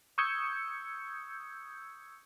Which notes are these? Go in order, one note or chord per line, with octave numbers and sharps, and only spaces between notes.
C#6 D#6 E6 G6 G#6 C#7